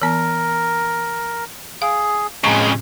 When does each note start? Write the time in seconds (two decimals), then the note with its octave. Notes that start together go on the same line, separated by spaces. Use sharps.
0.02 E3 B3 A#4
1.82 G#4 F5
2.44 F2 A2 C#3 G#3 C#6